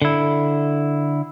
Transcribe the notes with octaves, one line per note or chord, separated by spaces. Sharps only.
D3 E4